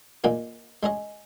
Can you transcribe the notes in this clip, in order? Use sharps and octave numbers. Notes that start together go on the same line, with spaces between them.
A#2 A#3 D#4 G#4
G#3 C#4 G#4 D#5